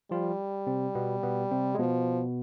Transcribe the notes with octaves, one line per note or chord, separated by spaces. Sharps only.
F3 G3 F4
C3 C4
B2 B3
B2 B3
C3 C4
G#3
B2 F3 B3